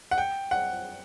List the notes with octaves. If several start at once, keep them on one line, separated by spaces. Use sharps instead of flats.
F#5
G5
F#5